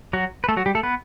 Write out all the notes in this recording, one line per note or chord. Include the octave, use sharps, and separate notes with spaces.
F#3 F#4
B4
A3 A4
F#3 F#4
G3 G4
A3 A4
B3 B4